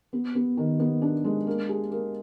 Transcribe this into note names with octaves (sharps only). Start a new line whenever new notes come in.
B3
B3
D#3
B3
D4
G#3
A#3
G#4
A#3